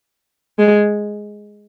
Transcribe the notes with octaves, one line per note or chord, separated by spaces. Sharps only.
G#3